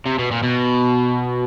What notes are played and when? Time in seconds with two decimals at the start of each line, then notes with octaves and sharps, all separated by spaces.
0.06 C3
0.19 B2
0.31 A#2
0.43 B2